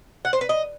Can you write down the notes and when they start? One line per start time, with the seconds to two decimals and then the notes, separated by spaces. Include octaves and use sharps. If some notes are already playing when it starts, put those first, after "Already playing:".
0.25 F#5
0.33 C5
0.41 B4
0.49 D#5